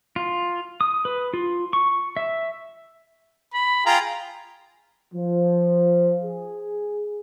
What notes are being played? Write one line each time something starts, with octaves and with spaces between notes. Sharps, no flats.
F4
D#6
B4
F4
C#6
E5
B5
F4 G#4 G5 A#5
F3
G#4